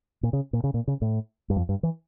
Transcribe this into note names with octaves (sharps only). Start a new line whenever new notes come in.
A#2
C#3
A#2
C#3
A#2
C#3
A2
G2
F2
G2
E3